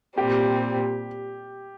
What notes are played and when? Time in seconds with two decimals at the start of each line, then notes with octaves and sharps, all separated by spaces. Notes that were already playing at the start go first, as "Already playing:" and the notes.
0.17 A#2 G3 C4 G4